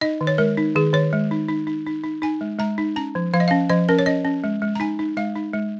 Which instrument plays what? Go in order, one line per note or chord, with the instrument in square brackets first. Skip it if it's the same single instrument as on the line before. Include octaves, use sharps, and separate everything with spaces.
[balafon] D#4 D#5
D#3
C#5
G#3 A#4
D#4
D#3 G#4
D#3 C#5
G#3
D#4
D#4
D#4
D#4
D#4
D#4 G#5
G#3
G#3 A#5
D#4
C#4 A#5
F3
F3 F5
D#5
C#4 F5
F3 D#5
C#4 A#4
C#5
C#4 D#5
C#4
G#3
G#3
A#5
D#4 G#5
D#4
G#3 F5
D#4
G#3